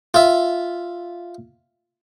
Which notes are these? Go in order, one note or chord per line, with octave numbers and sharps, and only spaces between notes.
F4 E5